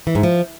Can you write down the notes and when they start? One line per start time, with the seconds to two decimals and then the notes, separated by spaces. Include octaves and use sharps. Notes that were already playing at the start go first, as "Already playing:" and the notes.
0.07 E3
0.15 G#2
0.23 F3